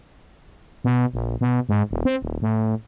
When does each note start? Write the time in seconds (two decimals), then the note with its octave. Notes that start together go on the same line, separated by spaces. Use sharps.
0.84 B2
1.13 A#1
1.41 B2
1.69 G#2
1.91 E1
2.05 C4
2.22 D#1
2.42 A2